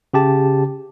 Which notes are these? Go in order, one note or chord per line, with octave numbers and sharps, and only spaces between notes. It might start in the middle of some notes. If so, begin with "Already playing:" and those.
C#3 G4 A5